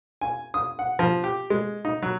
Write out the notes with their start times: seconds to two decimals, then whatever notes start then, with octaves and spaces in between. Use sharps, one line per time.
0.21 G#5
0.54 D#6
0.79 F#5
0.99 F3
1.24 G4
1.50 G#3
1.85 D#4
2.02 F#3